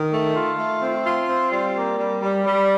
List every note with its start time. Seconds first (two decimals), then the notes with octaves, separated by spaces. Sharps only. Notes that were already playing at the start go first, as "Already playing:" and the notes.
Already playing: D#3
0.13 A3
0.35 F4
0.59 A3
0.82 C4
1.06 F4
1.29 C4
1.52 G3
1.76 A#3
1.98 G3
2.22 G3
2.45 G3